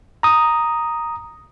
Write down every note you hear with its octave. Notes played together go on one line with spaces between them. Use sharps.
A#5 D#6